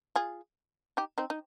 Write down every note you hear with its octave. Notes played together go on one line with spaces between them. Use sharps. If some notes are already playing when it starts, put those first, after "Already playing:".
F4 G#4
D#4 G4
C4 D#4
D#4